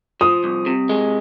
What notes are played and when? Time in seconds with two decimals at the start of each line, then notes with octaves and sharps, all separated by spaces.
0.21 F3 D#6
0.44 C2
0.66 C3
0.89 G#3